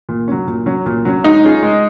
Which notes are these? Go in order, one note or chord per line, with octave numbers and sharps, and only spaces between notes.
A#2
F#3 C#4
A#2
F#3 C#4
A#2
F#3 C#4
G#3 D#4
C#4 F4 G#4
G#3